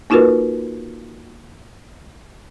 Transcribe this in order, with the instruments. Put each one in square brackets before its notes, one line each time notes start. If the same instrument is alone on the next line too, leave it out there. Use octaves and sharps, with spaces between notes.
[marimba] A#3 D#4 F4 F#4 A#4 B4